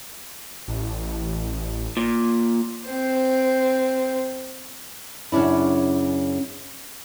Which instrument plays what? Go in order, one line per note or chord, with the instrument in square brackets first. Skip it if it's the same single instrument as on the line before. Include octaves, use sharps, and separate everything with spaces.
[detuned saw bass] A1
[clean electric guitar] A#2
[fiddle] C4 C5
[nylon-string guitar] F#2 C#3 C#4 D4 E4